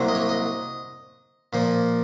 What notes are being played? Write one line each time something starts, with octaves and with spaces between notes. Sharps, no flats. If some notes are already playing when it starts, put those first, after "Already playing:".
Already playing: C2 C3 F#3 A#3
D#5
C#5
D#5
A#2 F3 A#3